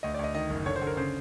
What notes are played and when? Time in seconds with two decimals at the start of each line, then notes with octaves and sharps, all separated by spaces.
0.03 D2 D#5
0.14 D5
0.19 D2 D#5
0.35 D#3 D#5
0.50 F#1
0.66 D3 C#5
0.76 C5
0.81 D3
0.87 A#4
0.97 C#3 C5